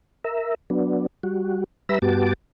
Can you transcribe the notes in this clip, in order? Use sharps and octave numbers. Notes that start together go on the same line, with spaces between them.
A#4 E5
F#3 B3 D4
G3 F#4
G3 B4 E5 A#5 B5 E6
G2 B3 F#4 G4 A5 D6